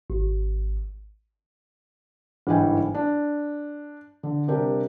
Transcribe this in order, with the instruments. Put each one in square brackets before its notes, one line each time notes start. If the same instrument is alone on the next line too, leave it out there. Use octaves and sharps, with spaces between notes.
[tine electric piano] G#1
[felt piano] G1 G#2 E3 G5 G#5
D4
D3
C3 G3 D4 G4 A#4